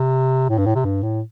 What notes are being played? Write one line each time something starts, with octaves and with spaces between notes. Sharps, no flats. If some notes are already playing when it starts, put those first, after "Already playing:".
Already playing: C3
A2
G2
A2
C3
G2
A2